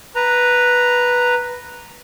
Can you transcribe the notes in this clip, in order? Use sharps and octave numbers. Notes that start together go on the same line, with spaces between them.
B4 A#5